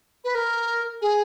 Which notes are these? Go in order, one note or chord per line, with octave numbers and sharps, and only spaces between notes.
B4
A#4
G#4